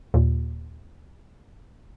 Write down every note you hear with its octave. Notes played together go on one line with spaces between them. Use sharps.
D#2 A#2